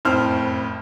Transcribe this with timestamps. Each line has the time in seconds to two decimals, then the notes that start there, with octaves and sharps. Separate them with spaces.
0.05 F#1 F2 A2 C5 F6